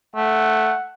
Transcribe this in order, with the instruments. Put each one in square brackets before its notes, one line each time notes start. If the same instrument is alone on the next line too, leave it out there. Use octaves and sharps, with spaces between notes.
[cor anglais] A3 [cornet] F#5